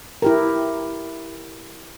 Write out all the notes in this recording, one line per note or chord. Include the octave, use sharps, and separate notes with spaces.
E4 G4 A#4